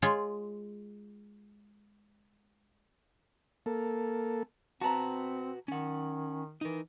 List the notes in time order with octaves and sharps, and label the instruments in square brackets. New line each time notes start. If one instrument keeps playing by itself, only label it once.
[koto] G#3 F4 C#5
[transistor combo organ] A#3 A4
[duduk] C4 [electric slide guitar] F#4 B4 [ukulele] A5 A#5
[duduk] D#3 [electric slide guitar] C#4 F#5
[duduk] E3 [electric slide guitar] D#4 A#4